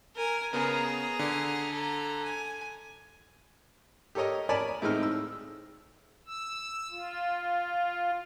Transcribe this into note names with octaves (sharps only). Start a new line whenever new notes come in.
A#4 G#5
C#3 B3 G#4 A#4 A#5
D3
A4 A#5
G#5
G4 A4 A#4 C#5 D#5
A#4 C#5 D5 G#5 A5 B5
A2 G#3 A3 C4 D#4 F6
E6
E6
F4